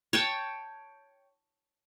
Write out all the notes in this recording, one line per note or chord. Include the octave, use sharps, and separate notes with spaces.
C#5 G5 A5